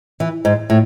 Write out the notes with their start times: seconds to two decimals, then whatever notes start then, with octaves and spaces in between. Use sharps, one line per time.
0.20 E3
0.45 G#2
0.70 A2